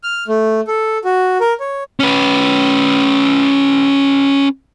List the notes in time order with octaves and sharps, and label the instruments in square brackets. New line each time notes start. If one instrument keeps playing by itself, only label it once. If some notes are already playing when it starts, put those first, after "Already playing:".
[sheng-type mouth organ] F6
A3
A4
F#4
A#4
C#5
[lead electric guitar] C#4 B4